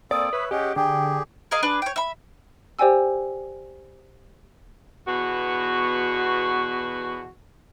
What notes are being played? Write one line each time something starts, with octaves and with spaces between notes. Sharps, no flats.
A#3 C4 A4 D5 D#6
B4 C#5 E5
C#4 G4 G#4 D#5 F#5
D3 G4 G#4 G5
G#4 A#4 D#5 F5
D4 G#4 B4
C#5 G5
E5 B5
G4 C5 D5 G5 G#5 E6
E2 B2 F#4